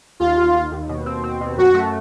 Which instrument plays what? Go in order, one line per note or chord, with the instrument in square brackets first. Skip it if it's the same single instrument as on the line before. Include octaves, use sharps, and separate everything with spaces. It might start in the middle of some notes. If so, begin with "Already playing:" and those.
[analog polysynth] D#2 [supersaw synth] F4
[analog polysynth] D#2
D#2
D#2
B2
C4
C4
B2
[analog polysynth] F#2 [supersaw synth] F#4
[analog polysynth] A3